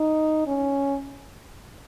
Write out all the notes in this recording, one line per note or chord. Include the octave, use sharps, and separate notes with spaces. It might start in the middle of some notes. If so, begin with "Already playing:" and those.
Already playing: D#4
C#4